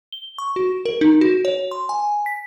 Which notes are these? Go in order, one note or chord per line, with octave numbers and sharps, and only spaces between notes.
G7
C#6
F#4
A#4
D#4
F#4
C#5
C6
G#5
B6